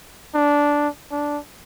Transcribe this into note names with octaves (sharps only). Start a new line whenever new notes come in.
D4
D4